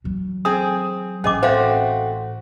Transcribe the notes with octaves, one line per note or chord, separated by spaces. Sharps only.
E3 F#3
C4 G#4 D#6
A1 C#4 G#4 D#5 D6
A3 C4 F#4 C5 F5